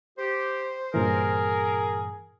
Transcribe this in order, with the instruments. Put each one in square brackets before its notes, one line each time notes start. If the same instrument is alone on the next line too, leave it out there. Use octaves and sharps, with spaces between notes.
[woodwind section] G4 [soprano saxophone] C5
[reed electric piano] G2 A#2 E3 [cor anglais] G#4 [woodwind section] A#4